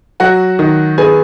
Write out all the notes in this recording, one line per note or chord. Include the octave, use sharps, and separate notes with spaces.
F#3 F#4 F#5
D#3
B3 G#4 G#5